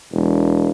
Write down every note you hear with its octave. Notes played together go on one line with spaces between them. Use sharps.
E1